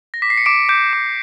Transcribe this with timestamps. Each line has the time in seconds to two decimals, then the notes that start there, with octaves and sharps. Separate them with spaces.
0.14 A#6
0.22 D6 B6
0.30 C7
0.37 C#7
0.46 D6 D7
0.69 D6 G6 D7
0.93 D6